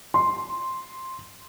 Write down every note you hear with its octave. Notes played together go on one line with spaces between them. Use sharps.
C6